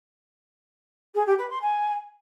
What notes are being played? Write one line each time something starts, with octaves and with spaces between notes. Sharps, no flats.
G#4
G4
B4
C6
G#5